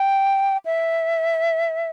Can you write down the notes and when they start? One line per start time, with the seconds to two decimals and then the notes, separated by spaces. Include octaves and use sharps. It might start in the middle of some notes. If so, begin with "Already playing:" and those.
Already playing: G5
0.65 E5